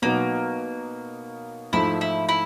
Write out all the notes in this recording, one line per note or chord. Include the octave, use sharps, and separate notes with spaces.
B2 F#3 A#3 B3 D#4
G#2 F3 A3 E4
E4
E4